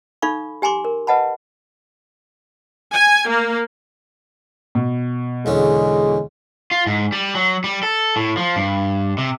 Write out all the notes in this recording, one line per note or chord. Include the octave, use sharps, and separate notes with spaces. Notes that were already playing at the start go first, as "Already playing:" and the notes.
D#4 A4 F5 B5 C#6
G4 G#5 A#5 C6 D6
A#4
B4 D#5 F#5 A5 B5
G#5
A#3
B2
E2 D3 G#3 C#4
F4
G#2
G3
F#3
G3
A4
A2
F3
G2
C3